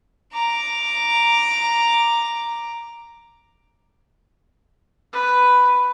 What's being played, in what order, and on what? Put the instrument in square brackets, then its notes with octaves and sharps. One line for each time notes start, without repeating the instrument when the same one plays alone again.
[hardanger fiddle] A#5 D6
[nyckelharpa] B4